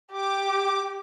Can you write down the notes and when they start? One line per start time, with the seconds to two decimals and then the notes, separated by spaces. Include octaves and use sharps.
0.12 G4 D6